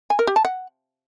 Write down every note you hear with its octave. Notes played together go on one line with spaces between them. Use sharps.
G#5
A#4
G4
A5
F#5